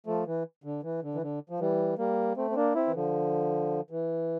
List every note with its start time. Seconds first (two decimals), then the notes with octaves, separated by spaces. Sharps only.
0.06 F3 A3
0.26 E3
0.64 D3
0.83 E3
1.03 D3
1.15 E3
1.22 D3
1.49 F3
1.60 E3 G3
1.98 G3 A#3
2.37 A3 C4
2.51 C4
2.56 A#3 D4
2.75 C4 E4
2.87 E3
2.94 D3 F3
3.91 E3